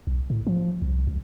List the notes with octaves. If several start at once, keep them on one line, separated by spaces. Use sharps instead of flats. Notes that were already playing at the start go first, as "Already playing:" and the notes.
B1
A2
F3
C2
C#2